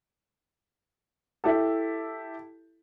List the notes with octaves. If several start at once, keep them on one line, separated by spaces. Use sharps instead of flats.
E4 G4 A4